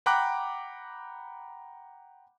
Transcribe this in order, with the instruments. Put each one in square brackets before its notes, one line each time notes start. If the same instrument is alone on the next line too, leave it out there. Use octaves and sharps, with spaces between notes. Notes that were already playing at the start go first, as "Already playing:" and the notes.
[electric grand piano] F#5 G5 A#5 B5 D6 F#6